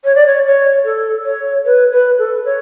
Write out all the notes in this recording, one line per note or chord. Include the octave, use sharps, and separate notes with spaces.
C#5
D5
C#5
C#5
A4
C#5
B4
B4
A4
C#5